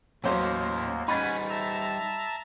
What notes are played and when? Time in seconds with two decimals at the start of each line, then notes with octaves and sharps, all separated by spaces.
0.24 D#2 A2 F#3 A#3 C#4 C5
1.08 G3 C#4 D#4 F#5 G#5 B5 A6 B6
1.50 E5 A5 A#5